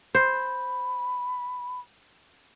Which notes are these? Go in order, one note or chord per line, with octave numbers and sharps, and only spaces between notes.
C5 B5